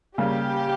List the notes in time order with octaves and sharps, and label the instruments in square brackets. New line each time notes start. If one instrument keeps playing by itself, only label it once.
[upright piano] C#3 G3 A#3 [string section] G4